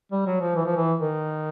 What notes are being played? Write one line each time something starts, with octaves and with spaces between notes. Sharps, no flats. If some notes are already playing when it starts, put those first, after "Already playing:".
G3
F#3
F3
E3
F3
E3
D#3